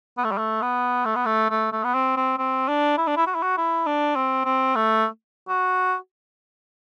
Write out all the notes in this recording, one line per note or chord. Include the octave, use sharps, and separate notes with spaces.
B3
A3
G3
A3
B3
A3
B3
A3
A3
A3
B3
C4
C4
C4
D4
E4
D4
E4
F#4
E4
F#4
E4
D4
C4
C4
A3
F#4